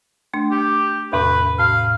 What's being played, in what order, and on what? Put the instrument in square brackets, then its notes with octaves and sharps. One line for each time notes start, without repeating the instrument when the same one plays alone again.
[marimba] A3 D4
[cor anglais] G4
[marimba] E2 A2 C3 [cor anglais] B4
[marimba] A2 [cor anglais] F5